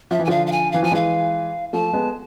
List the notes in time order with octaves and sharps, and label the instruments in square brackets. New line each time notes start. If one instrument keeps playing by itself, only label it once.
[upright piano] F3 [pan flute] E5
[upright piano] E3
[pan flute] G#5
[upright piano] D3 F3 [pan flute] F5
[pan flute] F5
G#5
[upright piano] E3 [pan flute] F5
[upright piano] F3 [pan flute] G#5
[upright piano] E3 G#3 [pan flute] F5
[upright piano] F3 A3 [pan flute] A5
[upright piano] G#3 B3